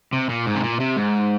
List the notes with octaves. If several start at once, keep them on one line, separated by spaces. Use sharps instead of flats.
C3
A#2
G#2
C3
A#2
C3
G#2